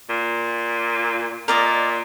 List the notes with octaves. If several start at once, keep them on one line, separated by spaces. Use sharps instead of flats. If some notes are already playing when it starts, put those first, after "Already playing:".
A#2
A#2 A#4 D5 D#5